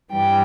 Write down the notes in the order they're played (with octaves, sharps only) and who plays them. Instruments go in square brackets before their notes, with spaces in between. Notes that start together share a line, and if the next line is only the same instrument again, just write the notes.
[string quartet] G2 E3 G3 G5